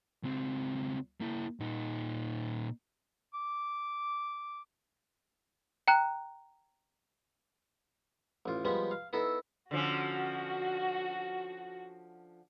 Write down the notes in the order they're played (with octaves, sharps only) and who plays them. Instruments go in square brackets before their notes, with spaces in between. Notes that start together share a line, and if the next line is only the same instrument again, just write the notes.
[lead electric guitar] C#2 C4
A#3 E4
A#2 D#4
[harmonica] D6
[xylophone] G5 A#5 F#6
[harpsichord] A1 F4
F3 G3 G#3 B3
F5
B3 D#4 E4 A4
[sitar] D3 F3 C#4 [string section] F#4